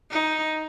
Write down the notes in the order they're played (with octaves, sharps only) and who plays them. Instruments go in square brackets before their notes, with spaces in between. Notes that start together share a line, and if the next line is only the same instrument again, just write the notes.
[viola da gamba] D#4